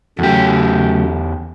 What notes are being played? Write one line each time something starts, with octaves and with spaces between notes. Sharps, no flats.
E2 C#3 F#3 A3 G4